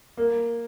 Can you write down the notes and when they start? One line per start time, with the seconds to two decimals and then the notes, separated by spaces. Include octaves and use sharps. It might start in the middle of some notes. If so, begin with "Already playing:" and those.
0.17 A#3